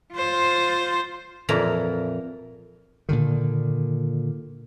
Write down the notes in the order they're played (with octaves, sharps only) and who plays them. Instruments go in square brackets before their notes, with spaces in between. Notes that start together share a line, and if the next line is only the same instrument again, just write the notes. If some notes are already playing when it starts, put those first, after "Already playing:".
[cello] F4 C5
[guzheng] F2 A#2 E3 A#5
[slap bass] A#2 D3 D#3